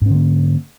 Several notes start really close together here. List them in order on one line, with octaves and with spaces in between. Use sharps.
G#2 C#4 D3 A#3